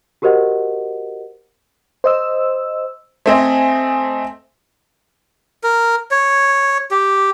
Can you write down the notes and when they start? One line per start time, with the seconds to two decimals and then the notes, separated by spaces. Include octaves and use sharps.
0.22 F#4 G4 A#4 C5 D#5 F#5
2.04 C5 D#5 E6
3.26 A3 C4 C5 D#5 G#5
5.64 A#4
6.11 C#5
6.91 G4